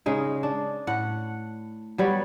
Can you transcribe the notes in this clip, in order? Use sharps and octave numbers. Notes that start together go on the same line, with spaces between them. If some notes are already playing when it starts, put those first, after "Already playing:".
C#3 G#3 D#4
D4
A2 F#5
F#3 G3 B3 C#5